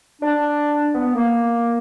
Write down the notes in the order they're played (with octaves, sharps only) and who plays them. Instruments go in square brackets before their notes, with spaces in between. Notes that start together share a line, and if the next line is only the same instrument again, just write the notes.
[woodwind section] D4
B3
A#3